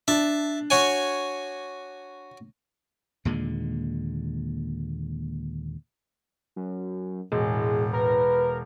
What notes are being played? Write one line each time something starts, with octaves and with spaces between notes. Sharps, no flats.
D4 E5 A5
F#4 C#5 G#5
D#2 A#2 D3 G#3
F#2
E1 A2 G#3
A#4 B4